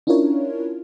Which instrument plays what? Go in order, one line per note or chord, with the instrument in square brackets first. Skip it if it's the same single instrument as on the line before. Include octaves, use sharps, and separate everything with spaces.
[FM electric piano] C#4 D4 E4 F4 A#4 C#5